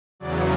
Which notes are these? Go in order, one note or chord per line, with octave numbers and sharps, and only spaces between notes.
E2 C#3 F#3 D5